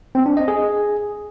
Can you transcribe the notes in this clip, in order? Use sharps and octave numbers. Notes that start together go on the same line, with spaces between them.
C4
D4
D#5
G#4